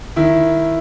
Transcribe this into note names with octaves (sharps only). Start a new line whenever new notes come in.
D#3 E4